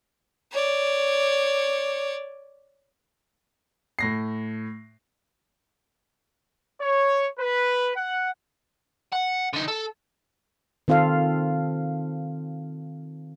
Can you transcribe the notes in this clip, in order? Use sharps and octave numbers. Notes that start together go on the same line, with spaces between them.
C#5 D5
A2 A#6 C7
C#5
B4
F#5
F#5
D3 D#4
A4
D#3 C4 F4 A4 F5